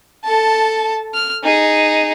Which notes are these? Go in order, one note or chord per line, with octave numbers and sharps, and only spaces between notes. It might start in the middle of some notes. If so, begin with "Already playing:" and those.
A4 A5
F6
D#4 G#4